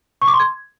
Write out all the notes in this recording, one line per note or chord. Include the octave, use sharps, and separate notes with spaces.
C#6
D6
C6
G#6